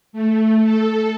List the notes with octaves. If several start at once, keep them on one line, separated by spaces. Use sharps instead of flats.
A3
A4